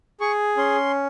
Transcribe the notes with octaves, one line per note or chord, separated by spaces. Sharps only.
G#4 C#6
C#4 C6